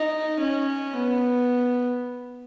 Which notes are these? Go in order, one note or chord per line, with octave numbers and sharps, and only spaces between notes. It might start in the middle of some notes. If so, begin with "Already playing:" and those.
Already playing: D#4
C#4
B3